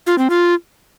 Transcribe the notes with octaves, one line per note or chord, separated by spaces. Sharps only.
F4
C4
F4